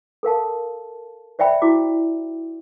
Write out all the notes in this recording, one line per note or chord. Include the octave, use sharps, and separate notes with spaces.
A4 A#4 F5 A5
C5 D5 E5 G5 B5
E4 F#4 D6